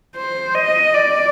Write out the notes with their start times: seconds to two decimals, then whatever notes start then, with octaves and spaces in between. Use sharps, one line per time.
0.16 C5
0.55 D#5
0.95 D5